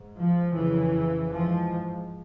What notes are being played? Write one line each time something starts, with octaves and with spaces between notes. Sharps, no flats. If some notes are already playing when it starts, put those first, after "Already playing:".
Already playing: G#2
F3
F2 C#3 E3
G#2 F3